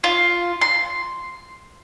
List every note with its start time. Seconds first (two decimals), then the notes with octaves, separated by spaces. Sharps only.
0.04 F4
0.61 C6